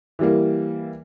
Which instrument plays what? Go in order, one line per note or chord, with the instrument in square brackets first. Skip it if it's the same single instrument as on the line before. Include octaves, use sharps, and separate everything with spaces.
[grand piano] E3 G3 A#3